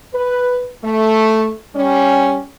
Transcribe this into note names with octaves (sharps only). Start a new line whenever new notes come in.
B4
A3
G3 C#4